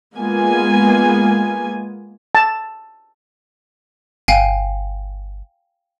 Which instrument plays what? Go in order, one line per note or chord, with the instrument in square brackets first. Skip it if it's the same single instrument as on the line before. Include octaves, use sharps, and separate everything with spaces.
[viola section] G#3 A#3 B3 F4 G#5
[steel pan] A5
[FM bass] G1 [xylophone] F5 G5 G#5